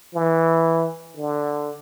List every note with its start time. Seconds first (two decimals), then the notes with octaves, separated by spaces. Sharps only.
0.15 E3
1.17 D3